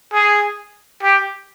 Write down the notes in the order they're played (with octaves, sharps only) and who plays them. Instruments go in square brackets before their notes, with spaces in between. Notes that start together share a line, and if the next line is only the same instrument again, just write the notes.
[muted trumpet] G#4
G4